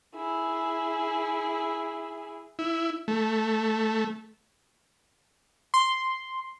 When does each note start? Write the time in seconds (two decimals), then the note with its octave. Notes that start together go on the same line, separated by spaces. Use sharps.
0.16 E4 G#4
2.59 E4
3.08 A3
5.74 C6